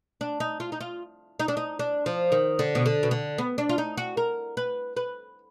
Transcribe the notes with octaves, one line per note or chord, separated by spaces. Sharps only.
D4
D#4
F4
D#4
F4
D#4
D4
D#4
D4
F3
D#3
D3
B2
D3
B2
D3
B3
D4
F4
D#4
F#4
A#4
B4
B4